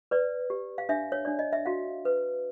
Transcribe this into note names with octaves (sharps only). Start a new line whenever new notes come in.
B4 D5
G4
F5
D4 E5
C#5
D4 D5
D#5
E5
F#4 F5
B4